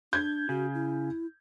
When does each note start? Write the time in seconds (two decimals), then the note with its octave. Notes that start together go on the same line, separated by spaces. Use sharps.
0.13 D4 G6 G#6
0.49 C#3 F#4
0.74 E4